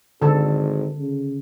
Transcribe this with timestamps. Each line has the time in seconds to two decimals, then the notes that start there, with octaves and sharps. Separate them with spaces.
0.22 G#1 D3 A4
0.98 C#3